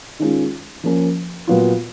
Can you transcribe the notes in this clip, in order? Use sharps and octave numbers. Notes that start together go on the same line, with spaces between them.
D#3 G#3 C#4 F4
F3 A#3 C#4
A#2 F#3 B3 F4